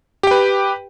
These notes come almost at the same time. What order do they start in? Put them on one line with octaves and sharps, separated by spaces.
G4 G5 B4